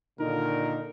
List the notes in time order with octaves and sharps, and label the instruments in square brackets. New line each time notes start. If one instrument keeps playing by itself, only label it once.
[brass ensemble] A#2 D#3 [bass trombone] D3 [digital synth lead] D#4 [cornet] A#4